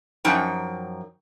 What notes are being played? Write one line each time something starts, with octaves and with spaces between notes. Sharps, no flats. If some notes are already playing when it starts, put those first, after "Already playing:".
F#2 F3 D#4 G5